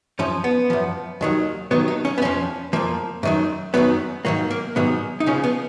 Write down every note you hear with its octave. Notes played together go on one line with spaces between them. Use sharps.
F#2 F3 C#4
B3
F#2 F3
D#2 D#3 F#3
D#2 D#3 F#3 B3
D#4
C#4
B3
F2 F3 C#4
F2 F3 A#3
F#2 D#3 F#3
F#2 D#3 F#3 B3
G#2 D#3 F#3 A#3
A#3
G#2 D#3 F#3 B3
D#4
C#2 C#3 F3 C#4
B3